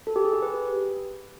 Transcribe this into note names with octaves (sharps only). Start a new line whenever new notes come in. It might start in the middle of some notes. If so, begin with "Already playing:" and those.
A4
G4
G#4
G4
B4